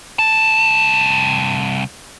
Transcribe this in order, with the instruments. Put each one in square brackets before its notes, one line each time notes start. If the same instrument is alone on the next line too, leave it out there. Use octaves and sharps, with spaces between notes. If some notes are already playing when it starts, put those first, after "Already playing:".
[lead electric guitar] C2 A5